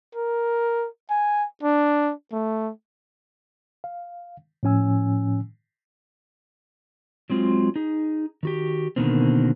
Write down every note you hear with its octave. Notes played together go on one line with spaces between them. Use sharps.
A#4
G#5
D4
A3
F5
A2 F3 C#4 G#5 E6
F#3 G#3 C4 F4
D#4 G#4
D#3 F#4 G4
B2 D3 D#3 A#3 C4